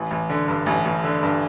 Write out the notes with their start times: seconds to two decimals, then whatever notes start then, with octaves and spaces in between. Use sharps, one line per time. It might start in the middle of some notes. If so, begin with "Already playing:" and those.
Already playing: A1
0.11 A1
0.30 D3
0.48 G2
0.66 A1
0.85 A1
1.04 D3
1.23 G2